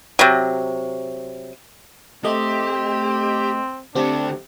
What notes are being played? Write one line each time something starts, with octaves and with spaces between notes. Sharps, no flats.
C3 F#3
A3 C4 G4 D#5
D3 A3 C4 D4 G4